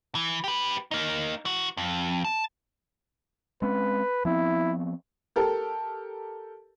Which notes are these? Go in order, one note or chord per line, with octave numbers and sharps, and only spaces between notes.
E3
G4 B4
A#3 D#4
E3 F#4
F2
A5
G#3 C4 C#4 B4
F3 B3 C4 E4
G4 A4 A#4